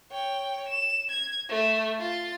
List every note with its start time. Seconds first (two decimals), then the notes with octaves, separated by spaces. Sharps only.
0.11 C#5 G5
0.68 E7
1.10 G#6
1.49 A3
1.99 F4 A6